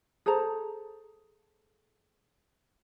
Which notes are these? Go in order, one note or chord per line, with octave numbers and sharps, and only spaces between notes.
G#4 A4 C5 A#5